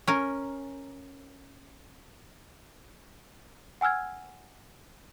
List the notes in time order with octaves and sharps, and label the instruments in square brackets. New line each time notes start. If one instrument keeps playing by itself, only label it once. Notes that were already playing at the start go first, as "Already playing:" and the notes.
[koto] C#4 A#4
[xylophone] F#5 G#5 E6 F6 G#6